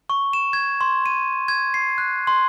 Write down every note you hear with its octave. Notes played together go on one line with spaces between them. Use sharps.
C#6
E7
G#6
C6
D#7
G#6
C7
F#6
C6